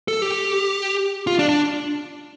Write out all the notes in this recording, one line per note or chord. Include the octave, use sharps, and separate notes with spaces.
A4
G4
F4
D4
D4